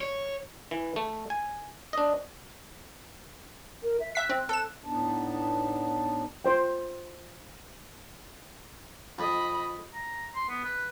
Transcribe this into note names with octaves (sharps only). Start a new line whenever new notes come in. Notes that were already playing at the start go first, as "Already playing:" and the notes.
C#5
E3
A3
G#5
D4 D#5
A#4
E5
E5 F#6 B6
C4
A4 E7
A2 B3 D4 D#4 A5
F4 C5 G5
F2 D#5 B5
A#5
C6
B3
B4